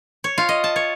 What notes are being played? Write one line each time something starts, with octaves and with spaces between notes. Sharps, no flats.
C#5
F4
D#5
A5
C#5